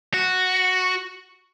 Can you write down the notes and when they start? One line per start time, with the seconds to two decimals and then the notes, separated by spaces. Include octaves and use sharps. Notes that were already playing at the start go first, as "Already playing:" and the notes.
0.14 F#4